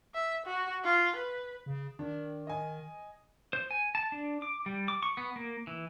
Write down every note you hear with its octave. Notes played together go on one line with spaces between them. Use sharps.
E5
F#4
F4
B4
C#3
D#3 D4
D#5 G#5
C5
G#5
A5
D4
D6
G3
D6
C#6
B3
A#3
E3